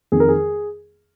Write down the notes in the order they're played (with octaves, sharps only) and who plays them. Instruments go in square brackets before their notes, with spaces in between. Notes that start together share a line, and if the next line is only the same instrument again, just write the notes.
[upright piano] F2 D#3 G#4
A#4
G#4